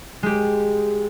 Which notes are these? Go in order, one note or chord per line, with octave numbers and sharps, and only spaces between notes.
G#3 G4